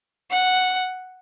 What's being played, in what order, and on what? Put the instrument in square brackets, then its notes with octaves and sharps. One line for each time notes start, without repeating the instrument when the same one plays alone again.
[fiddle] F#5